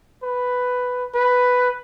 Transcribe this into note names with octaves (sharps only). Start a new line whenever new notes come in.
B4
B4